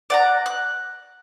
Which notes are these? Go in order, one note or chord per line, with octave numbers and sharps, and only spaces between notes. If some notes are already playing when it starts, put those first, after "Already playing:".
D5 F#5 A#5
F#6